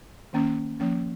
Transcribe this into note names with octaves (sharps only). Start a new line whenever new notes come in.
D#3 A#3 C#4
F3 A#3 C#4